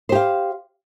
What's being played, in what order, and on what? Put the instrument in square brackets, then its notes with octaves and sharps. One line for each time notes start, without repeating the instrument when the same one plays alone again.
[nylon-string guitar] C5
G4
F5